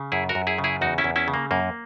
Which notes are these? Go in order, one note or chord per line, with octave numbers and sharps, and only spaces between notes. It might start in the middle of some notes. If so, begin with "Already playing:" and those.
Already playing: C#3
F#2 E4 G#4
F#4 A#4
F#2
E4 G#4
C#3
E4 G#4
E2 D#4 F#4
C#4 E4
E2
C#4 E4
C#3
A#3
F#2 A#3